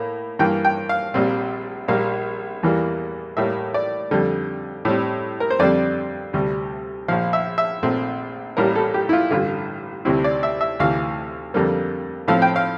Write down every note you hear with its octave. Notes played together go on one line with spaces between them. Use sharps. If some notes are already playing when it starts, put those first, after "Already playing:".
Already playing: A2 A#3
G2 E3 A#3 G5
G5
F5
A#1 A#2 G3 C4
A#1 A#2 G3 A#3 F5
E2 E3 G3 A#3
A2 G3 A#3 E5
D5
F2 D3 G3
A2 G3 C4
A#4
C5
F2 D3 G3 C4 D5
D2 C3 G3
A#1 A#2 F3 F5
E5
E5
A#1 A#2 A3 C4
A1 A2 G3 A#3 A#4
A4
G4
E4
F4
A1 G2 D3 F4
D2 C3 G3 C4 E4
D5
E5
E5
D2 C3 E3 F5
F2 D3 G3 A#3
A2 F3 A3 C4 F5
G5
F5